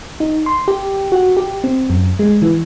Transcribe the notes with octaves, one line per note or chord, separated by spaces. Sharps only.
D#4
C6
G4
F#4
G4
C4
F#2
G#3
E3